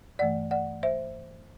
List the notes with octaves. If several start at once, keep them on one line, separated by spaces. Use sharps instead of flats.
G2 E3 A3 D5 F#5
D5 F#5
C5 E5